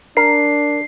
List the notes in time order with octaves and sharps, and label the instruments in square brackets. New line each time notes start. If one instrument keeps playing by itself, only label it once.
[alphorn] D4 [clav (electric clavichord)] A#4 [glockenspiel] C7